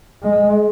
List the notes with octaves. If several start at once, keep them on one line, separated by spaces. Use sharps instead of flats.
G#3